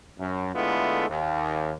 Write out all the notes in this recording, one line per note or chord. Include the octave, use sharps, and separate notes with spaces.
F#2
D3 G#3 A3 B3 E4 F4
D#2